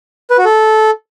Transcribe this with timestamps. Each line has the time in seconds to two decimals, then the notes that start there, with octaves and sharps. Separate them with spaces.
0.30 B4
0.38 F#4
0.45 A4